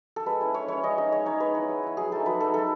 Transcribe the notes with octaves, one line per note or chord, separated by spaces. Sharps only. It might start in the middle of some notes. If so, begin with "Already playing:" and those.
A4
G#3 B4
C#4 E4
G#3 C#5
C#4 E4 C#5
G#3 D#5
D#4 D#5
G#3 C#5
D#4 C#5
G#3 B4
B3 E4
G#3
B3 E4
F#3 G#4
A3 D#4 A4
F#3 B4
A3 D#4 A4
G#3 A4